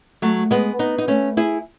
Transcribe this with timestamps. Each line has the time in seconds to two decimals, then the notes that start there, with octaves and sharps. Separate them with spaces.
0.22 F#3 A3
0.51 G#3 B3
0.79 B3 D#4
0.98 D#4
1.08 A3 C#4
1.37 E4 G#4